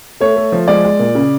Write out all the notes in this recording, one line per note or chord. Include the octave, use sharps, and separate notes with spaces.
A3 C#5
A3
F3
G#3 D5
G#3
A#2
C#3